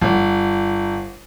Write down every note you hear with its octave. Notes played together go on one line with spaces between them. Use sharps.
G1